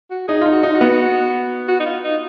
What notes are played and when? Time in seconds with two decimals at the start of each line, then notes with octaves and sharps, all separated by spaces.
0.11 F#4
0.28 D#4 G#4
0.41 F4
0.46 D#4
0.52 F#4
0.63 D#4
0.74 F#4
0.81 B3
1.68 F#4
1.80 D#4
1.85 F4
2.04 D#4